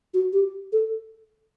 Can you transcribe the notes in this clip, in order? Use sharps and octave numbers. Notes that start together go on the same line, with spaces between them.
F#4
G4
A4